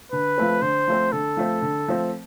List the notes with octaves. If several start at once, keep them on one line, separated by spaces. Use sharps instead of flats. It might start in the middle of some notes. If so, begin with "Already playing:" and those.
D3 B4
F3 A3 C4
D3 C5
F3 A3 C4
D3 A4
F3 A3 C4
D3
F3 A3 C4